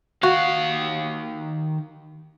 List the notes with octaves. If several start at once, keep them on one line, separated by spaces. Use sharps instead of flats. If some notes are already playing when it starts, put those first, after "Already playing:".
D#3 F#4 F5